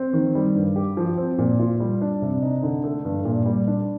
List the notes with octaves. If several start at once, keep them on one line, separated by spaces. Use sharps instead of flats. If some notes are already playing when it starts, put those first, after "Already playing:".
Already playing: C4
D#3
G3
G2
G4
F3
C4
A#2
F4
G3
D4
C3
D#4
D3
A3
G2
A#2
G3
D4